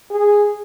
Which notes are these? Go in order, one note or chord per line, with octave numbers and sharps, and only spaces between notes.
G#4